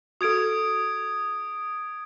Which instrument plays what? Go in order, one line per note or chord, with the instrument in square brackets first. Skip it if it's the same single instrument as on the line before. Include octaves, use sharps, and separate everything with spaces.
[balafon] F#4 A4 [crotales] D#6 G#6 D7